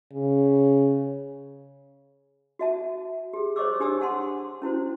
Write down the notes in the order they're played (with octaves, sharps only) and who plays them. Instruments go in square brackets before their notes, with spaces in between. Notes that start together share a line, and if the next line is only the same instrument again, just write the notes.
[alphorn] C#3
[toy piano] F#4 E5 A5
G4 G#4
C5 C#5 D#5 C#6 D6 E6
D4 G4 G#5 D#6 E6
F#5 A5 C6
C#4 E4 F#4 C5